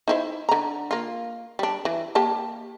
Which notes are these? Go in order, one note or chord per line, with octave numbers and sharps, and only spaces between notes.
D#4 E4 C5
D3 A#5
A#3 F4
G3 D4
E3
A#3 G4 A5